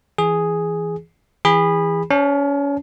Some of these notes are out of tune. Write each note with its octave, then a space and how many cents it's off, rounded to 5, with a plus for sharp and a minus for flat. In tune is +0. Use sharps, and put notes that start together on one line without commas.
E3 +0 G#4 +0
E3 +0 G#4 -30 B5 -5
C#4 +30 C5 +0 A5 -5